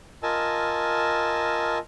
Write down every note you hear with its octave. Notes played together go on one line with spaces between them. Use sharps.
F4 A#4 D#5 G#5 A5 E6